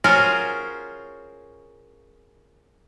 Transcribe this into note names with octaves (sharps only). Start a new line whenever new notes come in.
C#4 F4 F#4 G#4 A#4 C5